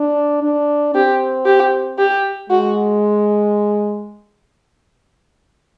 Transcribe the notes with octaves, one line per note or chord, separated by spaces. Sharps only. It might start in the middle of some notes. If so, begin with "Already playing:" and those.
Already playing: D4
D4
C4 G4
G4
G4
G#3 F#4